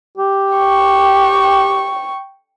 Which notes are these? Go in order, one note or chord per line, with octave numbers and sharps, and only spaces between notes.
G4
G5 C#6